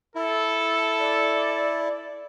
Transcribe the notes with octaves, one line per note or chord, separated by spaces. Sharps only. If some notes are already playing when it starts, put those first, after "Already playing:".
E4 A4
D5